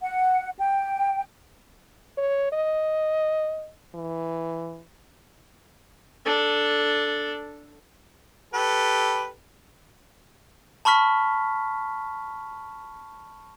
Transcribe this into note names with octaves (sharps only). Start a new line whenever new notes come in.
F#5
G5
C#5
D#5
E3
D4 A4
G4 A4 B4
A5 B5 C#6 F6 B6